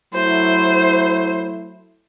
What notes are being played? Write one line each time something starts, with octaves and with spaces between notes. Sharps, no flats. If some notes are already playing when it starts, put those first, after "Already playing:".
F#3 A3 E4 C5